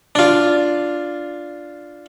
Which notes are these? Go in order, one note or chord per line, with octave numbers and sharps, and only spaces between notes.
D4 F4